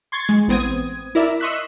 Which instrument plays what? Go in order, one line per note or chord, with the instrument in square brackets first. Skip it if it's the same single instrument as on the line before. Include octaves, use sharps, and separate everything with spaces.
[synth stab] C6 C#6 G#6 A6
G#3
A1 B3 C4 D#6 G#6
E4 A#4 D5 E5
D#5 C6 C#6 E6 F#6 B6